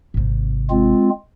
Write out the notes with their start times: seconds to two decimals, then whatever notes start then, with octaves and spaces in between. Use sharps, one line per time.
0.14 G#1 C3
0.70 G#3 C4 F4